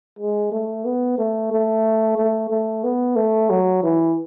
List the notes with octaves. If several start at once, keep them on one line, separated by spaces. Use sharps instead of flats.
G#3
A3
B3
A3
A3
A3
A3
B3
A3
F#3
E3